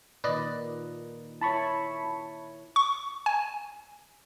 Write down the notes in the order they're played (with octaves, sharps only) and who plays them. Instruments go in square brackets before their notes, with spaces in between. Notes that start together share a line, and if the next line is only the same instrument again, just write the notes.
[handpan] A#2 D#3 [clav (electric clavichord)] B4 D5 D#5
[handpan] E4 C#5 [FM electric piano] A5 B5 C#6
[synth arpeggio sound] C#6
G#5